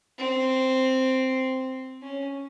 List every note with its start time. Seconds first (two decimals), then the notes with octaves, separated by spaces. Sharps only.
0.18 C4
2.02 C#4